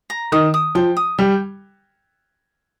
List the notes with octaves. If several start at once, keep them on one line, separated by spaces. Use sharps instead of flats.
A#5
D#3 D#6
D#6
F3 G5
D#6
G3 G5